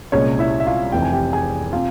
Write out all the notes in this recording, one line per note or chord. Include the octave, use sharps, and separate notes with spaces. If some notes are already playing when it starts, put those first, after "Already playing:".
C2 A#2 G#3 C#4 C#5
E4 E5
E5
F4 F5
F1 F2 E3 G5
G#5
G4 G5
G#4 G#5
C3 F4 F5